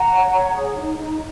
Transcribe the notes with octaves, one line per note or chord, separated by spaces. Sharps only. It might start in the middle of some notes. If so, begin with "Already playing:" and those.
Already playing: F#5 A#5
C#5
C#5
G#4
D#4
D#4